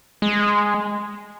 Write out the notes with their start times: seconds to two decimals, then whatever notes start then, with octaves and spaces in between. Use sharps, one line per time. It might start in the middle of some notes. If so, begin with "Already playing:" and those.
0.22 G#3